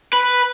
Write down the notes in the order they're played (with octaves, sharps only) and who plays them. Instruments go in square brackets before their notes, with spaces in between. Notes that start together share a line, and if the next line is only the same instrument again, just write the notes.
[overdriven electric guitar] B4